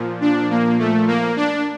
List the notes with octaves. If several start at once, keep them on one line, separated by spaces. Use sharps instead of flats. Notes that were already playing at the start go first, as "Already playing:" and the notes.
Already playing: A#2 F3
D4
A#3
A3
A#3
D4